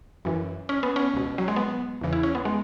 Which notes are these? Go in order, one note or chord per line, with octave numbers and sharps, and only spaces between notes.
F#2 E3
C#4
B3
C#4
C#2 B2
F#3
G#3
B3
E2 C#3 E3
E4
C#4
B3
G#3